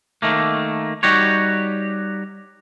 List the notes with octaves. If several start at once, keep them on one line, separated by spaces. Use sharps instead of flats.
D#3 A3 A#3
G3 D#4 F#4 G4 C#5